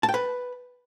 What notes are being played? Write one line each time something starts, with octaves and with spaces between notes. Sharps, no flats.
A5
G5
B4